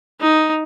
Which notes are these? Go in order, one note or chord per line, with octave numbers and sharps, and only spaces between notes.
D#4